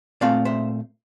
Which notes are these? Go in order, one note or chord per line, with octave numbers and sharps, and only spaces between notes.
A#2 A3 C4 F4 D5 F5
C5 E5